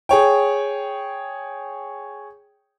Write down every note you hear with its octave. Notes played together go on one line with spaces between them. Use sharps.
G#4 C#5 G5